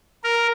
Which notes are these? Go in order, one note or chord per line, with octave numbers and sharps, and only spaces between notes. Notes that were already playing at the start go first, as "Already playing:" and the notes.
A#4